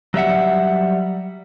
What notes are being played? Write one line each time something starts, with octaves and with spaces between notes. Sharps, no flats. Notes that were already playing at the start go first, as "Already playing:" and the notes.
F#3 G3 E5 F#5